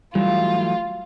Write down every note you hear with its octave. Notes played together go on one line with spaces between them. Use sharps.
E3 F#3 G3 A3 F4